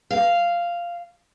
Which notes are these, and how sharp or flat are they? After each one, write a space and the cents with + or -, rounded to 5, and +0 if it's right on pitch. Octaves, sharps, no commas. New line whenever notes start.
F5 -10